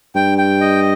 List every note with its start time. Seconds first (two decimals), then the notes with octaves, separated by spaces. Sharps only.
0.15 G2 G5
0.38 G5
0.61 D#5